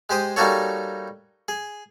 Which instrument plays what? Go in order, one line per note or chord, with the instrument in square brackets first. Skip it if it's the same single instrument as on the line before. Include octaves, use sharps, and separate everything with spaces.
[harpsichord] G#3 G4 C5 D#6
G3 A#3 D#4 F#4 A4 C#5
G#4